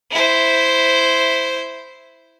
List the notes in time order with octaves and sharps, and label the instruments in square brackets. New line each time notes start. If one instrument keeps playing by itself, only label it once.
[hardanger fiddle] E4 C5